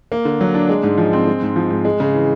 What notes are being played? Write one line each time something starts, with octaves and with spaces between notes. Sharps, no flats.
A#3
D3
F#3
D4
G#3
G#2
F3
C4
G#3
G#2
F3
G#2
G#3
C#3
E3